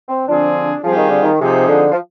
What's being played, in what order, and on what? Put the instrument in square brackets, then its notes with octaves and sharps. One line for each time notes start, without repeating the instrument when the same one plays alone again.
[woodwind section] C4
[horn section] D3 F3 C4 F4 G#4 [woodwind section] D4
[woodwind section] F3 [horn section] G3 C4 F4 G#4
[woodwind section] D#3
D3
D#3
[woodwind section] C3 [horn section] F3 C4 D#4 G#4
[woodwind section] D3
F3